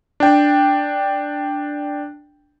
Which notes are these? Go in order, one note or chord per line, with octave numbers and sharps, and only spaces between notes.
D4 G5